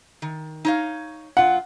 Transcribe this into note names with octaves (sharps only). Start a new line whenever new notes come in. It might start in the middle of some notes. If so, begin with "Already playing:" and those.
D#3
D#4 C#5 F5
G2 F4 F#5